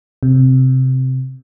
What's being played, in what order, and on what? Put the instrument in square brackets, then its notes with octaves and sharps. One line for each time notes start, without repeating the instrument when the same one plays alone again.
[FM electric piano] C3